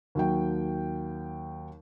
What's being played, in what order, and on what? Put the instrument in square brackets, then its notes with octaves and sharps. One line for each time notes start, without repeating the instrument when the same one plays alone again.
[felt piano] D#2 F#3 G5